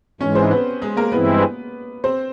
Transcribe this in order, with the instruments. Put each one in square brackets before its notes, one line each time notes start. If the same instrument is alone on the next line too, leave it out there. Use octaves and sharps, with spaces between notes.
[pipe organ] G#2 E3 G#3 [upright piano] C#4 C#5
[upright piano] C4 C5
B3 B4
G#3 G#4
A#3 A#4
[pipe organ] G2 E3 G#3 C4 E4 [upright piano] B3 B4
[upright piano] C4 C5